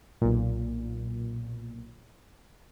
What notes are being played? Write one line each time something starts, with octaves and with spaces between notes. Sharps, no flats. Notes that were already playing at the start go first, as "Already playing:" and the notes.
B1 A#2